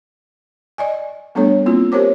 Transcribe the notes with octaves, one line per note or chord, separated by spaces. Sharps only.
D5 D#5 G#5
G3 A3 B3 D4 A4 C#5
A#3 C4 E4 F4
G4 A#4 C5 C#5 D6